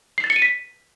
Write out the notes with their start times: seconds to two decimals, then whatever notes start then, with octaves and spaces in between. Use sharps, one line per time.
0.18 C7
0.24 A6
0.30 C#7
0.36 D#7
0.42 B6